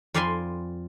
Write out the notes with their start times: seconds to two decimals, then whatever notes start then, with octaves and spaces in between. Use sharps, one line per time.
0.14 F2 D5 F5 G#5 B5 C6